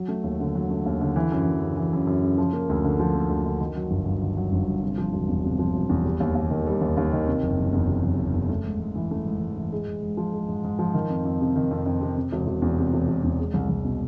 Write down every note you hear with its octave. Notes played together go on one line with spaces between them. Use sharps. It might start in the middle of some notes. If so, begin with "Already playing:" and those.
Already playing: F#3
A3
D#2
D3
F#3
A3
D#2
D3
E3
F#2
F#2
C#3
E3
F#2
F#2
C#3
F3
A#3
D2
D3
F3
A#3
D2
D3
D#3
F#3
G1
G2
D#3
F#3
G1
G2
C3
F3
E1
E2
C3
F3
E1
E2
G3
D#2
D#2
D#3
G3
D#2
D#2
D#3
C3
F#1
F#1
E2
C3
F#1
F#1
E2
A3
G#2
G#2
E3
A3
G#2
G#2
E3
G#3
G#2
G#2
F3
G#3
G#2
G#2
F3
D#3
F2
F2
C3
D#3
F2
F2
C3
C3
E1
E1
E2
C3
E1
E1
E2
G#3
C2
C2
B2